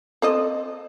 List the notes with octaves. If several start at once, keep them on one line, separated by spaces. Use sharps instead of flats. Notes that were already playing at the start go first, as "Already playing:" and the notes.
C4 A4 D#5